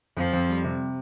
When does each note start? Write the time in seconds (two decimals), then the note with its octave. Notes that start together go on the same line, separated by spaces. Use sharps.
0.16 F2 F3
0.33 F2
0.49 G3
0.64 C3